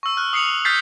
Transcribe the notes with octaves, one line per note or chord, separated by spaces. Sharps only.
C#6 E6
F6 F#6
D#6 C7 C#7 F7 F#7
D#6 F6 G6 A6 B6 C7